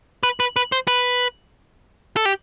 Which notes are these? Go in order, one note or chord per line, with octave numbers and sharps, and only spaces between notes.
B4
B4
B4
C5
B4
A4
G4